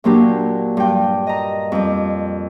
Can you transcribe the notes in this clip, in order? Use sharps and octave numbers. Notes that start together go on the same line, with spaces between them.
A#2 F#3 A#3 D4 G4
G2 G5
D#5 A#5
F2 G3